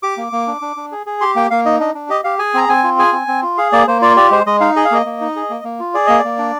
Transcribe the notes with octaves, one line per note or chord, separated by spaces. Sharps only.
G4 D6
A#3
A#3
D4
D4
D4
G#4
G#4
G4 C6
A#3 G5
A#3 F5
D#4 D#5
D4 D#5
D4
G4 D#5
G4 F5
G#4 G#5
C4 A#5
C4 G#5
F4
G#4 G#5
C4
C4
F4
G#4 F5
A#3 D5
A#3 C5
F4 D5
G4 D5
G#3 C5
G#3 D#5
D#4 F5
G#4 D#5
F5
A#3 D#5
A#3
D#4
G#4
A#3
A#3
F4
G#4 D5
A#3 D#5
D5
A#3
D4